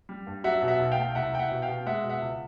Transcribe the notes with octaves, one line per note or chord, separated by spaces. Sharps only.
G3
G2
F#3 E5 F#5
B2
E5 F#5
B1
F5 G5
A3
C2 E5 F#5
C2 G5
E5 F#5
B2
F5 G5
B2
G#3 E5 F#5
B2
E5 F#5
C#2